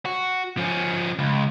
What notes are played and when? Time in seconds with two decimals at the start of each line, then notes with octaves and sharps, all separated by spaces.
0.05 F#4
0.57 F3 C#4
1.19 C#2